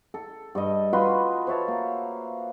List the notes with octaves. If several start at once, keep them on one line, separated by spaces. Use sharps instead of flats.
A4
G2 D#5
F4 F#4 B4 C6
C5 C#5 E5 A5
A#3